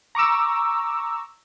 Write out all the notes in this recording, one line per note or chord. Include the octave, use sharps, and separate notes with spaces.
A#5 C#6 D6 E6